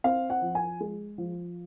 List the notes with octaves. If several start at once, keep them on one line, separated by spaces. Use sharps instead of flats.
C4 F5
F#5
F3
G#5
G#3
F3